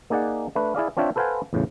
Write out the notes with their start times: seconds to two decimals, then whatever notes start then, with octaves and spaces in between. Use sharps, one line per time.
0.10 A#3 D#4 G#4 D5 F#5
0.55 A3 D4 B4
0.75 E4 G#4 D5 F5
0.97 C4 D4 F4 C#5 E5 G5
1.16 A4 B4 C5 F5 F#5 G#5
1.53 E2 A2 C#3